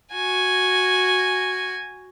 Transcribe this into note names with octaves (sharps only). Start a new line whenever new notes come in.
F#4 G#5